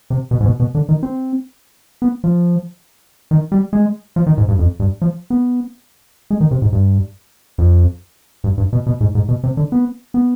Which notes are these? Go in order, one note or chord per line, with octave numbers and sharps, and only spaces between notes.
C3
B2
G#2
B2
B2
D3
D#3
C4
B3
F3
D#3
G3
G#3
F3
D#3
G#2
G2
F2
G2
F3
B3
G#3
D#3
C3
G#2
G2
F2
G2
G2
B2
B2
G#2
G#2
B2
C3
D3
B3
B3